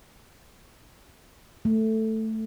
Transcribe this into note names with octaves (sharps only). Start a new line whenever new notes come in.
A3